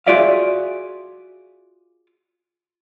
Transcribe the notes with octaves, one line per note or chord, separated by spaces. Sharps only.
F4 F#4 G#4 D5 E5 F5